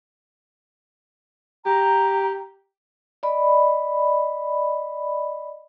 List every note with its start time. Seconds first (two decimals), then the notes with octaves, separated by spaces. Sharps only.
1.66 G4 A#5
3.23 D5 D#5 B5